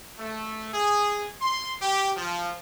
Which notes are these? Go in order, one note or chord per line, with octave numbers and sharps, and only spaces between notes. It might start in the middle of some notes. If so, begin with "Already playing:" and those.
A3
G#4
C6
G4
F3